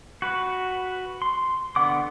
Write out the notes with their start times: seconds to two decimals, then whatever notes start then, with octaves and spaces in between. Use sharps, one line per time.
0.22 F#4 B4
1.22 C6
1.76 D3 B3 F#5 D6